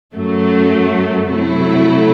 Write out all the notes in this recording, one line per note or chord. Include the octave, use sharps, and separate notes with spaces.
F#2 F#3 A3
C3 F#3 A3 E4